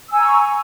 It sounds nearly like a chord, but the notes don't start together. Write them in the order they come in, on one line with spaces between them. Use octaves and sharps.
E6 G#5 A#5 C#6